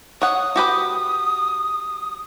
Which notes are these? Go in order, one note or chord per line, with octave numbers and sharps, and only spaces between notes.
C#5 F#5 D#6
F#4 G4 B4